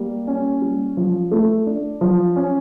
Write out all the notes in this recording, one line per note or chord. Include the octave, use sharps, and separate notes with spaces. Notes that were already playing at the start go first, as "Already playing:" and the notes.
Already playing: G3 A#3
C#4
G3
F3
A3
D4
F3
C#4